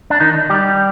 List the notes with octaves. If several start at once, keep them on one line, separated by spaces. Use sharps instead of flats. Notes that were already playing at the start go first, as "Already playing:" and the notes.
D4
D#3 D#4
G3 G4